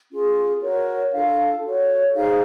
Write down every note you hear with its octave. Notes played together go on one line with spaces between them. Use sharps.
C#4 F4 G#4
F#4 A#4 C#5
D4 F4 A4 F5
F#4 A4 C#5
D#4 G#4 C5 F5